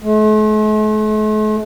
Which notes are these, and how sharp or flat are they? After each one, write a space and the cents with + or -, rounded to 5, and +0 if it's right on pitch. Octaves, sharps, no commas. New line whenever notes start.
A3 -45